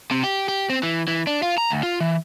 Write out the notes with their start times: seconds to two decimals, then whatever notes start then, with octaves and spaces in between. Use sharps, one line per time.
0.11 C3
0.24 G4
0.48 G4
0.70 C4
0.83 E3
1.08 E3
1.27 D4
1.42 F4
1.58 A#5
1.70 D2
1.83 F4
2.00 E3